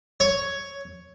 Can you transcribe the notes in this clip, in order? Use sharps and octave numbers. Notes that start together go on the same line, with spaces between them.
C#5